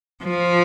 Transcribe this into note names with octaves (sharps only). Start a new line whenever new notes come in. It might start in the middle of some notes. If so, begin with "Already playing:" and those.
F3